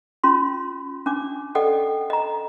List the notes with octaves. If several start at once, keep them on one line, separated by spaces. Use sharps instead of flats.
C#4 F4 C6
C#4 D4 D6
A4 D5 D#5 F#5 G5
D#5 A#5